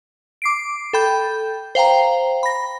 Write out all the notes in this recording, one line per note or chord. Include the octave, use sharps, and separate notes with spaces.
D6 C7 D7
A4 G5 B5 G6
C5 F5 G5 A#5
B5 A#6